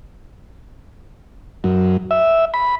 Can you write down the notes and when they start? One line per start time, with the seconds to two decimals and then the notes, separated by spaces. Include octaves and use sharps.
1.64 F#2
2.11 E5
2.54 B5